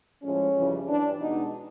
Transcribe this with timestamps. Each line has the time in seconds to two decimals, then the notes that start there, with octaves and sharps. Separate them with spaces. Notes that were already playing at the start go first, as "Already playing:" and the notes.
0.22 A2 F3 G#3 C#4
0.55 F2 C#3 E3 G3
0.87 G2 E3 G3 D4
1.19 B2 G#3 D#4